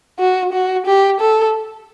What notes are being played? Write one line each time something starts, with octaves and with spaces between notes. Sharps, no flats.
F#4
F#4
G4
A4